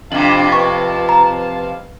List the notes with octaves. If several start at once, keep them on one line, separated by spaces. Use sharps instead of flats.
F2 C3 D4 F5 A5 D6
B4 C#6
A#5